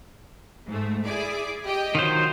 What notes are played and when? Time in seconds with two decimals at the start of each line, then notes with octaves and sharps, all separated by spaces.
0.66 G#2 A3
1.04 E4 G#4 D5
1.65 G4 D#5 G5
1.95 D#3 F#3 F4 C5